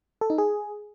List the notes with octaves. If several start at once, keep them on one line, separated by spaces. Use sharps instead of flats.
A4
D#4
G#4